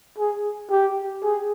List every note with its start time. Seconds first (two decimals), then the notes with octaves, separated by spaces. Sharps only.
0.18 G#4
0.71 G4
1.23 G#4